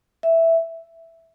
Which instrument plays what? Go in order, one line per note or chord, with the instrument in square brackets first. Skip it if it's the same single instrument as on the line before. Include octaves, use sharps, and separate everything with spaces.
[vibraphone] E5